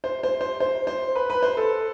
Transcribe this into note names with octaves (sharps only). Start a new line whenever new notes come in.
C5
C5
C5
C5
C5
B4
B4
C5
A4